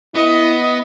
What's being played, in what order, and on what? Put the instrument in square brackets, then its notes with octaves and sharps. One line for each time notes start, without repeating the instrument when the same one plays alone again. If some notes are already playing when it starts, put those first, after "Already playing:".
[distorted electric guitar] B3 [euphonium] E4 [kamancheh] D#5